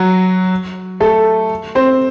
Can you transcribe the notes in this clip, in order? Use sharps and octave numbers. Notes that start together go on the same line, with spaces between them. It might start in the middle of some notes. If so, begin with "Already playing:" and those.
Already playing: F#3 F#4
A3 A4
C4 C5